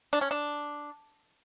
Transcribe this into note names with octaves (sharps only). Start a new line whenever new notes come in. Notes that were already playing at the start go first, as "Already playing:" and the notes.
D4
C#4
D4